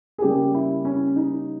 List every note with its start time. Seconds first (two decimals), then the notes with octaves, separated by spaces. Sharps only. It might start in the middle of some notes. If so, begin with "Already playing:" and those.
0.18 G#4
0.22 C#3 G3 A#3 C#4 G4
0.54 E4
0.85 C#4
1.16 D#4